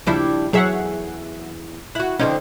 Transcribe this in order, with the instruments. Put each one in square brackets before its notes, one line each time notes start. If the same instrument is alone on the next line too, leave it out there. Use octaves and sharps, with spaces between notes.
[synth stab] D#2 C#3 F3 [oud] G3 D4 E4
[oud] E2 G#4 C#5 [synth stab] F#3 E5 F#5
[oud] E4 F#4 [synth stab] F#6
[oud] D3 C4 D#4 [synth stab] F3 C#4